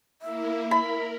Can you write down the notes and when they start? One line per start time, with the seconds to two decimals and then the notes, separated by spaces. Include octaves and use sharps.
0.22 A#3 E4 E5
0.71 A#4 B5